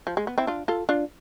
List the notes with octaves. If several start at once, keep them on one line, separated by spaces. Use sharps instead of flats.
F3
G#3
B3
C4 E4
D4 F4
F4 A4
D4 F4